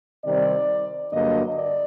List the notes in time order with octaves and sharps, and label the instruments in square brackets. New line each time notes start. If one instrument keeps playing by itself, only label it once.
[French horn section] C3 D#3 G3 C4 D5
G2 D3 F#3 A#3 D4 D#5
D5